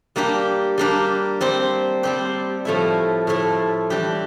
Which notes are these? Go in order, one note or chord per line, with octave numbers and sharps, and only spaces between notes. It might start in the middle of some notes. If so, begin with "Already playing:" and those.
G3 A#3 D4 G4
G3 A#3 D4 G4
G3 C4 G4 C5
G3 C4 G4 C5
A2 F3 A3 E4
A2 F3 A3 E4
E3 G3 D4 G4